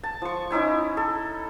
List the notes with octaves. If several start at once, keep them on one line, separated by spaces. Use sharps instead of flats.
A5
F3 C#6
C#4 D#4 E4 G#5
A4